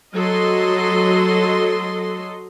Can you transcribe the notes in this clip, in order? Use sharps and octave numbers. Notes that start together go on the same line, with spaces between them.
F#3 A4 D#5 C6